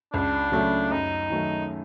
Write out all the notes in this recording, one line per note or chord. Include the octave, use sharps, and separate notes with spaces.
C#2 D4
C#3 F#3 A3
F#2 D#4
D#3 F#3 A3